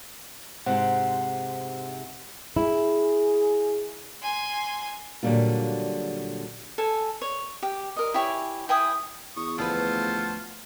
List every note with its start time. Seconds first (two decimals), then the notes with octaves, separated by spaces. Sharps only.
0.66 G#2 C3 C5 F#5
2.56 E4 G#4
4.22 G#5 C6
5.23 A#2 D3 F#3 G3 A#3 F4
6.78 A4 G#5
7.22 C#5
7.63 G4
7.96 A#4 D#5
8.14 E4 G4 C#5 G#5
8.69 E4 G5 G#5 D#6
9.37 E2 C#6 D#6
9.58 D2 F3 F4 F#4 A4 B4 C5